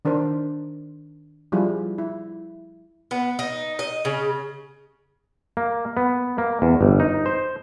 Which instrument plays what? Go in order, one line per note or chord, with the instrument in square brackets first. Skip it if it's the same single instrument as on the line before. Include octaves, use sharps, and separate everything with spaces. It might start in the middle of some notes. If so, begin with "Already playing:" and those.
[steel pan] D#3 D4 A#4 C5
F3 G3 E4 F4 G#4
E4
[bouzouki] B3
D#4
D#5
C#3
[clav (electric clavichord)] A#3
B3
A#3
E2
G1
D#4
C5